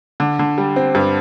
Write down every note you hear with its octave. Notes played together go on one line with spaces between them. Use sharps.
D3
D3
G3
C4
G2